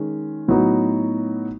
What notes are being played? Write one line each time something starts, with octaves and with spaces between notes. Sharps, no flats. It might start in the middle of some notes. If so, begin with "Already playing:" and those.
Already playing: D#3 G#3 C#4
A2 F#3 B3 D#4 F#4